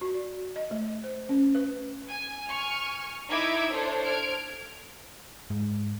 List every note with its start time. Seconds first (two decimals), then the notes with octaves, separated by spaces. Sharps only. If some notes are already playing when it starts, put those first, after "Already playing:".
0.01 F#4
0.14 D5
0.56 D#5
0.71 A3
1.04 C5
1.29 C#4
1.55 B4
2.10 G#5
2.48 G#5 C#6 F6
3.29 D#4 E4 E5 D6 E6 G#6
3.72 D4 A4 C5 C#5
4.06 F6 G#6 D7
5.50 G#2